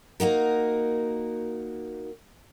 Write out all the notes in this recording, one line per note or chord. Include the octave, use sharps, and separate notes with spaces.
A#3 D#4 F#4 A#4